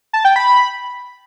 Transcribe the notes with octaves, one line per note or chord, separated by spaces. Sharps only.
A5
G5
B5